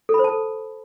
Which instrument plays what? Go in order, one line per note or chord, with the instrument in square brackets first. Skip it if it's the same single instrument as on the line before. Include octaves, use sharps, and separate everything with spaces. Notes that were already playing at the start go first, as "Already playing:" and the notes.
[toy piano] A4
B5
C5
A5
A4